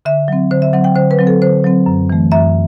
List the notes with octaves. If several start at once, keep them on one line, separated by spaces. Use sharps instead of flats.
D3 E5
F#3 C4
D3 C5
E5
F#3 C4 F#5
G5
D3 C5
B4
F#3 C4
A4
D3 C5
F#3 C4
F#2
E3 A3
F#2 E5